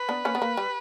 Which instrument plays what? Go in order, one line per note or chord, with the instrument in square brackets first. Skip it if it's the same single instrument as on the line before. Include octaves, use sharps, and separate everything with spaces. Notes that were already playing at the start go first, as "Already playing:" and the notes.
Already playing: [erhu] B4
[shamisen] B3 D4
A#3 C#4
B3
A#3
G3